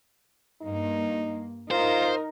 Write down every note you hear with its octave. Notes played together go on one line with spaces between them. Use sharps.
G2 A#3 D#4
D#4 F4 A#4 C5